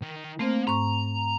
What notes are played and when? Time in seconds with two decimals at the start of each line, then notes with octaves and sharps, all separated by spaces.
0.02 D#3
0.39 A3 A#3 C4 C5
0.67 G#2 A#5 C#6